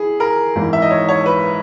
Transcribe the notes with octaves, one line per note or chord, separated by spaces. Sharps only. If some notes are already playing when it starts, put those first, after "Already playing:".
Already playing: E4 G#4
A#4
G#1 G#2 E3
E5
D#5
C#5
C#5
B4